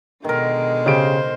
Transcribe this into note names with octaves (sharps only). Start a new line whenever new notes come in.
B2 D3 D#3 G#3 A#4
C#3 G4 C5 D7